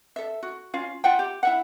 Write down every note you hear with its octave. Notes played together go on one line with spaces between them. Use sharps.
A4 E5
F#4
C#4 F4 F5
F4 E5 F#5 G5
G4
E4 E5 F#5